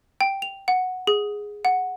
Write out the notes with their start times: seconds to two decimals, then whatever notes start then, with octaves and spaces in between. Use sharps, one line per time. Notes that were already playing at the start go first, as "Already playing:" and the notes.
0.21 G5
0.42 F7
0.68 F#5
1.07 G#4
1.65 F#5